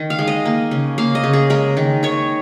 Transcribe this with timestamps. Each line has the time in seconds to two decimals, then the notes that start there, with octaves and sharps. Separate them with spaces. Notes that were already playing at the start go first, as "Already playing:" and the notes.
Already playing: D#3
0.10 F5
0.19 G#3
0.28 D#5
0.45 A#3
0.71 C#3
0.98 A#3 F5
1.15 D#5
1.24 C#3
1.33 G#4
1.50 G#3 A#4
1.77 D#3
2.03 D#3 C#5